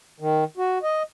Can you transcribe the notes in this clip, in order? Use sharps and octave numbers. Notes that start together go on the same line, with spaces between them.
D#3
F#4
D#5